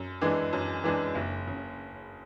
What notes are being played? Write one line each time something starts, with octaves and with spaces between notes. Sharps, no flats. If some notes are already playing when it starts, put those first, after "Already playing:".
Already playing: F#2
E3 G#3 D4 G#4
F#2
E3 G#3 D4 G#4
F#1
C#3